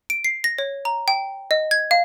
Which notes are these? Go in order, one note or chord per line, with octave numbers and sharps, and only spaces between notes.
D7
C7
A#6
C#5
A#5
G5
D#5
G#6
F5